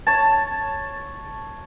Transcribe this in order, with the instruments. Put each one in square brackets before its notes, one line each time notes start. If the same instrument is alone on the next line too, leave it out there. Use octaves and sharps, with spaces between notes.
[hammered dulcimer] C#5 A5